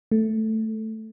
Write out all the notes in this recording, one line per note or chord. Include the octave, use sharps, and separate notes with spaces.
A3